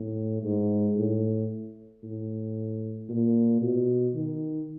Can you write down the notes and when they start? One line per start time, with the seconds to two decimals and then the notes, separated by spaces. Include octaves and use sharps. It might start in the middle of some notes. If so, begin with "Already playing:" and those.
Already playing: A2
0.44 G#2
0.97 A2
2.03 A2
3.09 A#2
3.62 B2
4.15 D#3